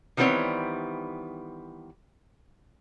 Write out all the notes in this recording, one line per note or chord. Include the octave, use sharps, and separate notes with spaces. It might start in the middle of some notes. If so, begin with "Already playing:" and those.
D#3 E3 G3 B3 C4 C#5